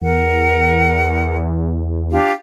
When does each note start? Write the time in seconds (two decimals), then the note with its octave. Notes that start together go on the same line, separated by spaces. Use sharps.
0.01 E2 A#4 F#5
2.11 D4 F4 G4